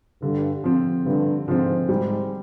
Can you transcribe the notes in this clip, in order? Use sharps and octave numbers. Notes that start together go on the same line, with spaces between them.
G2 D3
F3 C4
G2 D3
G#2 F3 C4
G#2 G3